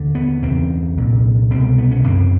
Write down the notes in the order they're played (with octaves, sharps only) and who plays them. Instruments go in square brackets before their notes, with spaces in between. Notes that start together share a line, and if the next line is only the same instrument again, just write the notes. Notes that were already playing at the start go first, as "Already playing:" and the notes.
Already playing: [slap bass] D#2 D3
B3
E2 C#3 C4
C2 A#2
C2 B2 C4
B3
C#4
F#2 C#3 C4